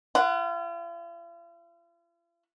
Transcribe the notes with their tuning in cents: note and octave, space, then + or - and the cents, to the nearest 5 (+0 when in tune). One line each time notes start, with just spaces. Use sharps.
F4 -45 F#5 +0